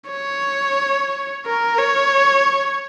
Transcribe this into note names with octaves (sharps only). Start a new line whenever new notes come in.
C#5
A#4
C#5